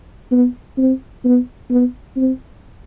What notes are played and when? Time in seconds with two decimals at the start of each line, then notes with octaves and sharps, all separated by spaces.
0.32 B3
0.78 C4
1.24 B3
1.70 B3
2.16 C4